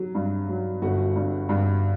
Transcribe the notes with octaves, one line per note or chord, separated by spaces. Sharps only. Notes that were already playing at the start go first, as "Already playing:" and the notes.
Already playing: F#3
G2
F#3
G1 F#4
G2
G2